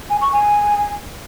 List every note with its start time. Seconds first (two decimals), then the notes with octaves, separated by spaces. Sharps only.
0.10 G#5
0.21 C#6
0.33 G#5